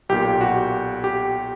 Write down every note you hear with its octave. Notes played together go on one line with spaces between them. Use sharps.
B1 A#2 G4
F#4
G4